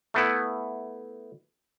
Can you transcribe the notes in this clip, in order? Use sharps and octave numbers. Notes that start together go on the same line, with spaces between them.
A3 B3 E4